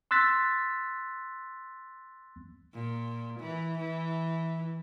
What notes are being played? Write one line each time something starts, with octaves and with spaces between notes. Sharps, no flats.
C6 E6 F#6 A6 B6
A#2
E3
E3